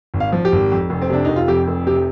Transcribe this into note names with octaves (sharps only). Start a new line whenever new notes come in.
G#1
F5
F3
G4
G#1
F2
F1
C4
C3 D4
F1 D#4
F4
F2 G4
F1
C3 G4